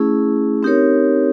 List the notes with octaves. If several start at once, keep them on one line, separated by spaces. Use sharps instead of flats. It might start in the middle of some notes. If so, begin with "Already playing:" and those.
Already playing: A3 C#4 E4 G#4
C4 D#4 G4 A#4 C#5